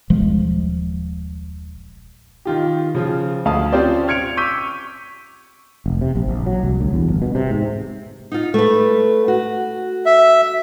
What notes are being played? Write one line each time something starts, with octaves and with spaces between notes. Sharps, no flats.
D#1 B1 F3 G#3
D#3 F4 G4
C#3 F3 F4
D2 F5 A5 D#6
C4 C#4 F4 G4 C5 D5
F6 G#6 C#7 D7 F7
C#6 D6 E6 G6 B6 D#7
F1
C3
A#1
A#1
F#3
C2
D2
E2
G1
B2
C3
G#2
D#4 F4
A3 B4
F#4
E5